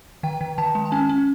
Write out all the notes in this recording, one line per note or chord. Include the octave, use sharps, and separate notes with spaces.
D#3 G5
D#3
D#3 A5
G#3
A5
C#4 G#5
C#4